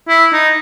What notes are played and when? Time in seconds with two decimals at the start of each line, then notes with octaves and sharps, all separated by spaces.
0.08 E4
0.33 D#4